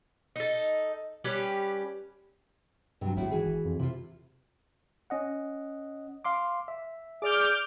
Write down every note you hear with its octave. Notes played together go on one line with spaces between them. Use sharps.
D#4 A4
G3 C#4 G4 B4
G2 C3 F#3
G#1 A2 E4 F#4
E3 F#4 G#4
F2
C3 E4 F4
C#4 D#5 F#5
F5 C6 D6
E5
G#4 D5 D6 F6 G6